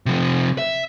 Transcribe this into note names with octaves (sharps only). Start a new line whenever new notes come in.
C3 F3
E5